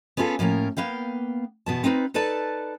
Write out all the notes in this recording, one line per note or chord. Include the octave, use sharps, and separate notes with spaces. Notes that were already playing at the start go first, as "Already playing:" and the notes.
B3 C#4 F4 G#4 A4
A2 F3 A#3 C#4 A#4
A#3 B3 F5 G5
E2 B2 B3 A5
C4 D#4 F4 B4
D#4 A4 B4 D5 A5